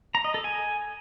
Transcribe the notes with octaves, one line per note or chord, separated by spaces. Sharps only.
A#5
D#5
A4
G#5